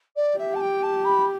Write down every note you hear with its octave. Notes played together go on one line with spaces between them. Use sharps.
D5
G4 E5
A5
G5
A5
B5